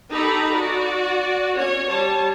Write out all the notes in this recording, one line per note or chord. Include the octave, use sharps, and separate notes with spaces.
D#4 G4 A4 A#5 B5
F#4 D5
C#4 C#5
G3 C#5 A5